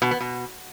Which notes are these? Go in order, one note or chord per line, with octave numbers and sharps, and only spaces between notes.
B2
B3
B2